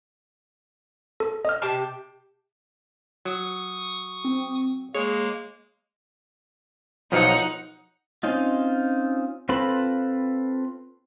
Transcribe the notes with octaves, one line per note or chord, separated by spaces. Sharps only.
A4
D#5 F6
C3 G4 A5
F#3 C#6 D#6
C4
G#3 A#3 G#4 C#5
B1 F3 F#3 D#4 F#5
C4 C#4 D#4 F4
C4 F4 A4 B4 B5